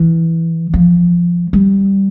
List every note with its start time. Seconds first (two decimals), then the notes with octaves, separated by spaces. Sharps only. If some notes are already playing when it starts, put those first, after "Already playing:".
Already playing: E3
0.74 F3
1.53 G3